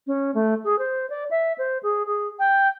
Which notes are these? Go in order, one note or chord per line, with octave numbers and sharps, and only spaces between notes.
C#4
A3
G#4
C5
D5
E5
C5
G#4
G#4
G5